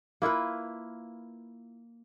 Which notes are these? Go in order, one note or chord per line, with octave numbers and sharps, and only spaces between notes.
A#3 E4 F4 B4